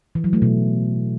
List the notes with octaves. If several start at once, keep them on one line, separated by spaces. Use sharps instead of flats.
E3
F#3
A3
B2